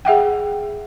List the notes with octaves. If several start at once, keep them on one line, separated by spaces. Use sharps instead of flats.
G#4 E5 F#5 G5